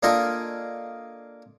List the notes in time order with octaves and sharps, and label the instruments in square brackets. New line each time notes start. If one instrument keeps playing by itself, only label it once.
[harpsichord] A#3 D4 F4 A4 D#5 G#5